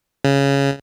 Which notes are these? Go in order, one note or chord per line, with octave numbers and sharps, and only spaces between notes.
C#3